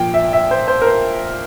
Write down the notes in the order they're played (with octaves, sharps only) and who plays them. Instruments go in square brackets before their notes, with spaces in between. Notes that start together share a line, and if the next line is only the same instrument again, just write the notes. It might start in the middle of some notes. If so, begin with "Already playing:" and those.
Already playing: [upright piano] A#2 F3 G5
E5
E5
C5
C5
A#4
C5